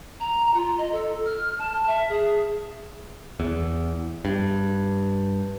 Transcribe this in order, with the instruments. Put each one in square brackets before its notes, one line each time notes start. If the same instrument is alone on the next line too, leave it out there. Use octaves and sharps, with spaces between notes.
[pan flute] A#5
F4
D#5
A4
F6
A5
E5
G#4
[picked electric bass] E2
G2